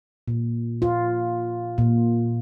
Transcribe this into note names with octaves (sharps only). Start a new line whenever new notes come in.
A#2
F4
A#2